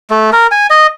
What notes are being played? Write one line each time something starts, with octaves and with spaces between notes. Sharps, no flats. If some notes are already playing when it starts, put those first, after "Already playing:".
A3
A#4
G#5
D#5